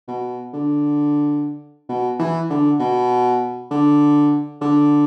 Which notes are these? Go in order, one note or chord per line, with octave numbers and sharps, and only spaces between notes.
B2
D3
B2
E3
D3
B2
D3
D3